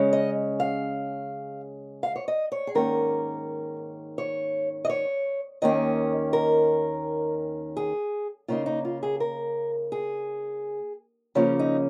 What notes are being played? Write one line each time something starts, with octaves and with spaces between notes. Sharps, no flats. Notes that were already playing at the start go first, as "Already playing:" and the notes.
Already playing: C#3 G#3 C#4
D#5
F5
F5
C#5
D#5
C#5
G#4
G#2 D#3 A#3 C#4 A#4
C#5
D#5
C#5
D#2 D#3 A#3 C#4 D#5
A#4
G#4
C#3 A#3 D#4 F4
D#4
F4
G#4
A#4
G#4
C#3 F3 A#3 C#4 F4
D#4